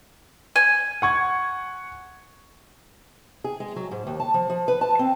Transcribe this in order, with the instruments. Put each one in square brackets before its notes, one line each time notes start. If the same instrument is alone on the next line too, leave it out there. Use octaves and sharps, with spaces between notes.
[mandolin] G#5
[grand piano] F#5 C#6 G#6
[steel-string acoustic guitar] G#4
G#3
F#3
G#2
D#2
A5
F3
F3
B4
A5
C4